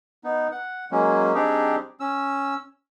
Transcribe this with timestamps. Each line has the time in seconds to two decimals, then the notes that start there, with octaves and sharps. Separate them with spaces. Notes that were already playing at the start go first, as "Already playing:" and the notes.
0.24 B3 D#4
0.52 F#5
0.91 F#3 G#3 A#3 C#4
1.34 G3 C4 D4 D#4 G4 G#4
2.00 C#4 E6